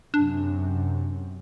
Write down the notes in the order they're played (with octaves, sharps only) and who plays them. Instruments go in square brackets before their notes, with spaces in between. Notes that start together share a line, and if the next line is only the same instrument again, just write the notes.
[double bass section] F#2 C3 [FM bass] D4